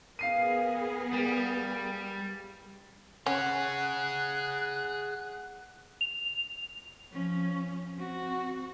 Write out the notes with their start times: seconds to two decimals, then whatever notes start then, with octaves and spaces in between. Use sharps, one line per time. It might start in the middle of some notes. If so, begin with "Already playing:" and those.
0.19 B3 G#4 A#4 F5 C7 D#7
1.13 G3
3.26 C#4 G#4 C#5 F#5 F#6
6.01 F7
7.12 F3 C#4
7.96 C4 F#4